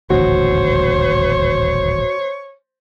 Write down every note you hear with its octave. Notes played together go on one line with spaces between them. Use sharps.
D#1 A1 D2 F#4 C5 C#5